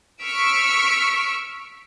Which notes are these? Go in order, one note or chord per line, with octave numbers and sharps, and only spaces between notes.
C#6 E6 F6 B6 D7